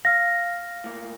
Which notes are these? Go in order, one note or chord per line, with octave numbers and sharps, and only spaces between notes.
F5 F6 A#6
A2 A#3